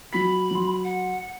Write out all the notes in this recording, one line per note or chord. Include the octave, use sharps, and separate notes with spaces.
F#3 B5 B6
F#3 C6
F#5